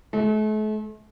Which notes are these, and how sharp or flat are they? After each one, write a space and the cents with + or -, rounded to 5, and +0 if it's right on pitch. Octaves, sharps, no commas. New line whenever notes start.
A3 -40